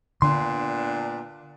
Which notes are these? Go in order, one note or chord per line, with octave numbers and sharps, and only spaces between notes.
A#2 D3 B3 D4 C6